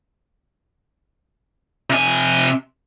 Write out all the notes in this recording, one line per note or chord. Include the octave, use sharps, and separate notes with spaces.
C3 G#5